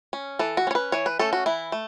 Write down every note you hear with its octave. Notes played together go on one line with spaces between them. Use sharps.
C#4
E3 A4
F#4
C#4 C#5
B4
E3 C#5
B4
A3 C#4 A4
F#4
E3 E4
A3